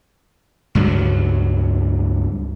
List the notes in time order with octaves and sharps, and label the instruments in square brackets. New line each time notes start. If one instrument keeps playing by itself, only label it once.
[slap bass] C#2 G2 F#3